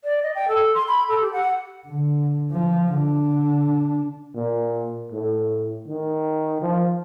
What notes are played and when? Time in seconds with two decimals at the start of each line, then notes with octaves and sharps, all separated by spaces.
0.04 D5
0.23 D#5
0.35 G5
0.49 A4
0.75 C6
0.88 B5
1.09 A4
1.21 G4
1.33 F#5
1.86 D3
2.52 F3
2.91 D3 D4
4.35 A#2
5.12 A2
5.88 D#3
6.62 F3